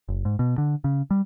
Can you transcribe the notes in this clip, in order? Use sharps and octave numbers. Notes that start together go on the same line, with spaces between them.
F#1
G#2
B2
D3
C#3
G3